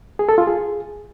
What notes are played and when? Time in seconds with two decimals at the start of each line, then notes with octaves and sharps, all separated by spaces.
0.19 G#4
0.29 A4
0.38 F4
0.47 G#4